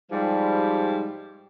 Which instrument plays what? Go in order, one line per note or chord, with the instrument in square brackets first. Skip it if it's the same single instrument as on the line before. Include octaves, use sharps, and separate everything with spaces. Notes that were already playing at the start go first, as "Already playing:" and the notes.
[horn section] G#2 F3 G3